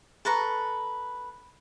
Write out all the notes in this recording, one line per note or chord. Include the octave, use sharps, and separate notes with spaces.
A4 B4 A#5 C#6